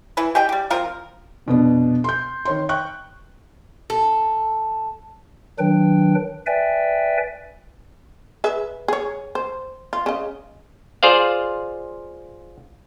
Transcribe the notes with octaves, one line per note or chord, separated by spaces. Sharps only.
E3 E4 B4
G4 G#4 D#5 G5
G3 G4
F3 C4 F4 A#4
F1 B2 B3 D4
C6 G6
D#3 C#5 C6
G5 C#6 F#6
A4
D#3 F#3 D4 B4 G5
B4 D5 E5 G5 G#5
G#4 B4 E5
G#4 C#5
C5
F4
C#3 D#5
F4 G#4 C5 D5 F5